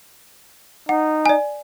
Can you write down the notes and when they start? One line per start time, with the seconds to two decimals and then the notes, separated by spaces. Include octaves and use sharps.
0.89 D#4 F#5
1.26 D5 G#5